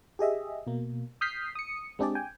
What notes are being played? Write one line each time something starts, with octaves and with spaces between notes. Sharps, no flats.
G4 G#4 D#5 E5
B2 A#3
D#6 F6 G6 B6 C7
D#6 C#7
G#3 C4 D4 G4 G#4 D5
G5 G#5